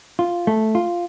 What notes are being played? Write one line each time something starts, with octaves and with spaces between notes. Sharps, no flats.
F4
A3
F4